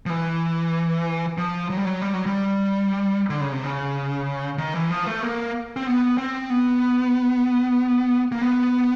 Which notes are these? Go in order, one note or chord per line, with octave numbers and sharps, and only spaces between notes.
F3
E3
F3
F#3
G3
F#3
G3
F#3
G3
D3
C#3
C3
C#3
D#3
E3
F3
A3
A#3
C4
B3
C4
B3
A#3
B3